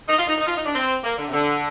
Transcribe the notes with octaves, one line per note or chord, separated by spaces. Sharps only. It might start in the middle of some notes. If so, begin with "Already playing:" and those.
D#4
F4
D#4
D#4
F4
D#4
D4
C4
A#3
D3
C3
D3